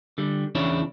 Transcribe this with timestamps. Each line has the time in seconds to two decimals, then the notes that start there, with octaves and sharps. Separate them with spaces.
0.18 D3 G3
0.55 E2 C#3 D4 E4 C#5